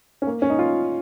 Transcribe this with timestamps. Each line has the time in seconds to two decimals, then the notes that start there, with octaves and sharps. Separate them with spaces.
0.22 C#4
0.27 A#3
0.42 C#4
0.50 D#4
0.59 F4